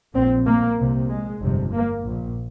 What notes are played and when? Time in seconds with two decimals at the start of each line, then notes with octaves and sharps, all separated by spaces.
0.14 A#1 A#2 C4
0.46 A#3
0.77 C2 C3
1.09 G#3
1.40 G1 F2 C3
1.72 A#3
2.04 A#1 A#2